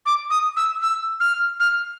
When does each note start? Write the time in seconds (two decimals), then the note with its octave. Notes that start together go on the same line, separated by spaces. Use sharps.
0.06 D6
0.30 D#6
0.57 E6
0.82 E6
1.20 F6
1.60 F6